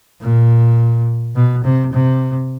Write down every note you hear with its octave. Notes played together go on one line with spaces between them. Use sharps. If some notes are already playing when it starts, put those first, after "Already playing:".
A#2
B2
C3
C3